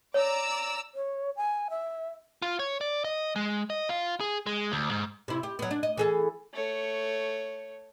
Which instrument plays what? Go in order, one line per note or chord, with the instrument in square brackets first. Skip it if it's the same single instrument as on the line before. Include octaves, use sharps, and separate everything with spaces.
[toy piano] C#5 [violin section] D5 A#5 E6
[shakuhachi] C#5
G#5
E5
[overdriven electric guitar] F4
C#5
D5
D#5
G#3
D#5
F4
G#4
G#3
D2
G#2
[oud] C3 E4
G4
F#3 B3
D4
D#5
E3 G#4 A4
[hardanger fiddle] A3 C#5